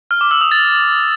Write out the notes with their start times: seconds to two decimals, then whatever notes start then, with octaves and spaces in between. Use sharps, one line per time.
0.11 F6
0.21 D6
0.31 E6
0.41 D#6
0.51 A6